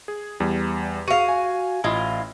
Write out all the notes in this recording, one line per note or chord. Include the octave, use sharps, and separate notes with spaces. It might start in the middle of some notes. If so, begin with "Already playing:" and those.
G#4
E2 G3
F#4 G#4 F5 D#7
G#5
A1 E4 F4 D#5